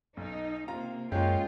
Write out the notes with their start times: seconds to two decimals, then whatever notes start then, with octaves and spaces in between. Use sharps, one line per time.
0.17 B1 D#4
0.68 C3 A#3 F4 A#5
1.12 F#2 G#3 A#3 F4 C#5 G5